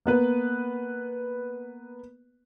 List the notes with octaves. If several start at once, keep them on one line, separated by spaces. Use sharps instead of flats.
A#3 B3 B4